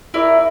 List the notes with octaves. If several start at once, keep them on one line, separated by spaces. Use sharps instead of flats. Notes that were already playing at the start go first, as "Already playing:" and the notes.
E4 A#4 D5